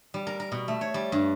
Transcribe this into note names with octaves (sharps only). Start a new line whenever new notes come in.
G3
A#4
A#4
B2
A3
C#5
G3
G2